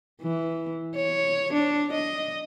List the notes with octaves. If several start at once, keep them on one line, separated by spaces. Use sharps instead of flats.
E3
C#5
D4
D#5